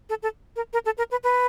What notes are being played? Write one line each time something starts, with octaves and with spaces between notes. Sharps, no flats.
A4
A4
A#4
A#4
A4
A#4
B4
B4